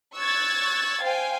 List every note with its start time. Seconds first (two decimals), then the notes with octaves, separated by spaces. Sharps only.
0.17 C#6 E6 F#6 G#6 A6
1.04 C5 F5 G5 G#5